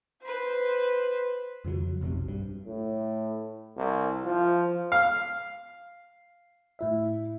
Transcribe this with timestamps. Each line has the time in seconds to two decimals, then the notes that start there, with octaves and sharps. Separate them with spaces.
0.23 B4 C5
1.65 F2 C#3 F3 F#3
2.01 F1 B1 G#2 C3
2.28 G2
2.66 A2
3.77 C2
4.25 F3
4.92 F5
6.79 A2 E4 E5